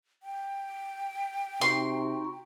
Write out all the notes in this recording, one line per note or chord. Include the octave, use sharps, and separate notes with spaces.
G5
C3 D#4 F#4 C6